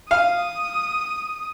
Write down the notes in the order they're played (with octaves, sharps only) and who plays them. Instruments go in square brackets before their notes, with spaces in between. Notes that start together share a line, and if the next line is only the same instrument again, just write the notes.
[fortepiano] F5 [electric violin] D#6